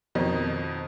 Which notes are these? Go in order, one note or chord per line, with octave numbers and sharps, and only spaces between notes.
F2 B2 D#3 F3 D#4